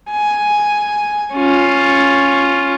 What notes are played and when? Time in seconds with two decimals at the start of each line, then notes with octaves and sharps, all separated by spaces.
0.12 G#5
1.34 C#4 F4